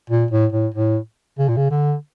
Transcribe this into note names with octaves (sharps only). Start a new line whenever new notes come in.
A#2
A2
A2
A2
C#3
A#2
C#3
D3